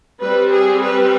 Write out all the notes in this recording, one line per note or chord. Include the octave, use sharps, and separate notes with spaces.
G3 C4 B4
G#4
B4